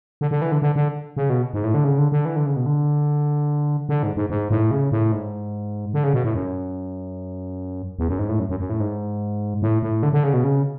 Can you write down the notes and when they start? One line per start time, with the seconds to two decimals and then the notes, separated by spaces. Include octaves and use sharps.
0.21 D3
0.31 D3
0.42 E3
0.52 D3
0.62 D3
0.76 D3
1.17 C#3
1.30 B2
1.54 G#2
1.64 A2
1.74 D3
1.84 C#3
1.98 D3
2.12 D3
2.25 E3
2.36 D3
2.46 C#3
2.56 B2
2.66 D3
3.89 D3
4.03 G#2
4.17 G#2
4.30 G#2
4.51 A2
4.71 C#3
4.92 A2
5.12 G#2
5.94 D3
6.04 C#3
6.14 B2
6.24 A2
6.35 F#2
7.99 E2
8.09 F#2
8.19 G#2
8.29 A2
8.39 F#2
8.50 F#2
8.60 F#2
8.70 A2
8.80 G#2
9.62 A2
9.83 A2
10.03 D3
10.13 D3
10.24 C#3
10.34 B2
10.44 C#3